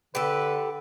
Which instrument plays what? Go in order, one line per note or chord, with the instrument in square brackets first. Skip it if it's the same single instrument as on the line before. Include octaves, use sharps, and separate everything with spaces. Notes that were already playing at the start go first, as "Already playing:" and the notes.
[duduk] D3 [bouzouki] G4 A4 [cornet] B4